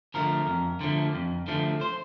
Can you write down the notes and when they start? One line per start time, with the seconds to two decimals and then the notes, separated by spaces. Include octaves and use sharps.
0.14 D3 F3 A3 A#4
0.47 F2
0.81 D3 F3 A3
1.15 F2
1.48 D3 F3 A3
1.81 C5